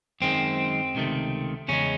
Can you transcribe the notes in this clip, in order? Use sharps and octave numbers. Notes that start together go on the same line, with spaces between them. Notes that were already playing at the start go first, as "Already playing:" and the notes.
F#2 D#3 G#3 C4
C#2 C3 D#3 A3
E2 C#3 G#3 C#4